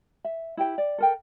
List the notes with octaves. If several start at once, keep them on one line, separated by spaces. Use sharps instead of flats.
E5
E4 G4 G5
D5
A4 A#4 G5